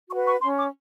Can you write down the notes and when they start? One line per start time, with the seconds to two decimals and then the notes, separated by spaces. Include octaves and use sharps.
0.09 F#4 C#6
0.13 B4
0.26 C#6
0.41 C#4 C6
0.57 D6